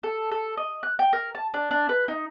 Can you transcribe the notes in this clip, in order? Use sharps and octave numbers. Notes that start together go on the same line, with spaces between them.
A4
A4
D#5
F#6
G5
A#4
A5
D4
D4
B4
D#4